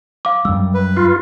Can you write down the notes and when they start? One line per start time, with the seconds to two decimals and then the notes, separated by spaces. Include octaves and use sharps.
0.25 F5 D6
0.45 F#2 G3 E6
0.74 B4
0.97 F4